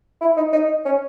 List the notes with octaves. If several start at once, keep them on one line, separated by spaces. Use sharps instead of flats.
E4
D#4
D#4
C#4